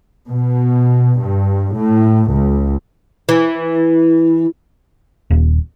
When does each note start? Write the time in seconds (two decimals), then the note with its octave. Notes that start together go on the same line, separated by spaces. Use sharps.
0.28 B2
1.21 G2
1.77 A2
2.33 C#2
3.29 E3
5.31 D#1